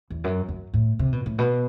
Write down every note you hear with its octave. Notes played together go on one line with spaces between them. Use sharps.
E2
F#2
F#2
A2
C3
B2
A2
B2